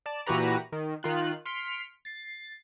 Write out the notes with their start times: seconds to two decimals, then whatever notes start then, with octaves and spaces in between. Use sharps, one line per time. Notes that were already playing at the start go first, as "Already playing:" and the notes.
0.06 D5 A5
0.26 A#2 E3 F#4 G4 B4 A#5
0.72 D#3
1.03 D#3 F4 F#6
1.45 C6 F6 B6 C#7 D7
2.05 A6 C7